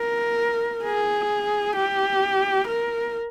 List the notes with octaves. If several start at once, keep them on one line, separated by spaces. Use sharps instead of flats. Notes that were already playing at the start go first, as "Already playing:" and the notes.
Already playing: A#4
G#4
G4
A#4